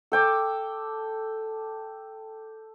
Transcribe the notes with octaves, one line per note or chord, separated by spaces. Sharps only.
A4 G5 D6